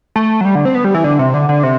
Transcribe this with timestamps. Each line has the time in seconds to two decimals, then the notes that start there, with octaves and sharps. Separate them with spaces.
0.16 A3
0.41 F#3
0.45 G3
0.55 D3
0.65 C4
0.75 B3
0.84 G3
0.94 E3
1.04 D3
1.19 C3
1.34 D3
1.49 D3
1.63 C3